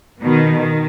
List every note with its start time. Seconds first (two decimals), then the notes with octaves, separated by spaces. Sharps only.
0.22 B2 D#3
0.58 D#3